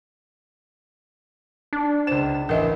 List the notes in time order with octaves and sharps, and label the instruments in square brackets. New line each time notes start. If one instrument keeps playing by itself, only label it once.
[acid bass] D4
[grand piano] C#2 E7 [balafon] C5
[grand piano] A1 [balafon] A#4 D#5 E5